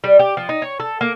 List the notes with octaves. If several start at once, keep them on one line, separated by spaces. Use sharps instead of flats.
G3
G4
F3
D#4
C#5
A4
A#3